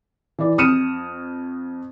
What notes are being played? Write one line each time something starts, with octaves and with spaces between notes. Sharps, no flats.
E3 D5
F2 D#6 F6 C#7 D#7 E7